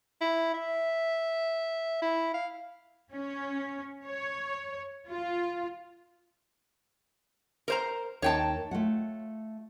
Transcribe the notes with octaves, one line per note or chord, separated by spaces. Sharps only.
E4
E5
E4
F5
C#4
C#5
F4
A#4 C5 A#5
D#2 D#4 C#5 G5 A5
A3 F4 F#5